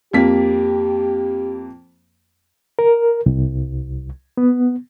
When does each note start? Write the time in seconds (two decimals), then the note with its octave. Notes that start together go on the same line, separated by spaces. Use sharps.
0.14 F2 A#3 G4 B6
2.79 A#4
3.26 C2
4.37 B3